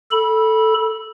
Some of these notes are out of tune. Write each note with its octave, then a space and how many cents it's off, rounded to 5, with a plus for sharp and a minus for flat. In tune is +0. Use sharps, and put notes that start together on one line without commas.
A4 +0 B5 -20